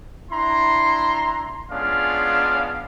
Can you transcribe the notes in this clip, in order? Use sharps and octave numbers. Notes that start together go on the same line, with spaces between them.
D4 E4 A#5 C6
G#3 B3 C#4 D4 F4 F5